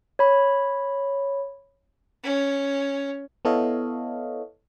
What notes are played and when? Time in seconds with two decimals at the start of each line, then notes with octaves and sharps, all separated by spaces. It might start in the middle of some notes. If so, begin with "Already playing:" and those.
0.19 C#5 B5
2.24 C#4
3.45 B3 E4 A4 C#5 D#5 F5